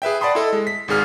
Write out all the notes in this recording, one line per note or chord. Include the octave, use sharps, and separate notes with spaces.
G#4 B4 E5 G5
D5 F#5 A5 B5 C6 D#6
E4 A4 D#5
G#3
B6
G#1 G#2 G#4 F6